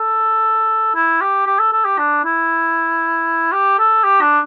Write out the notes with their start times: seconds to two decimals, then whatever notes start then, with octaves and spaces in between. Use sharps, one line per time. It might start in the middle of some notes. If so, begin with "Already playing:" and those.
Already playing: A4
0.95 E4
1.21 G4
1.47 G4
1.59 A4
1.72 A4
1.85 G4
1.98 D4
2.25 E4
3.52 G4
3.79 A4
4.04 G4
4.21 D4